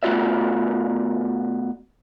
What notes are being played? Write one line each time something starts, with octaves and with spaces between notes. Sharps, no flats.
B2 A3 F4 F#4 D5 E5